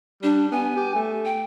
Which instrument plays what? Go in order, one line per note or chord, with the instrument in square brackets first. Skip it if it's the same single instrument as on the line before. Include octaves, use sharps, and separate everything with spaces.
[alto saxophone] G3 [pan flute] D4
[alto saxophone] B3 [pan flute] G#5
[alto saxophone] G4
A3
[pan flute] G5